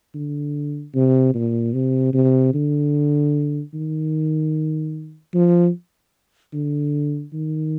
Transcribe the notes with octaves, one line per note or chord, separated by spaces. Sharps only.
D3
C3
A#2
C3
C3
D3
D#3
F3
D3
D#3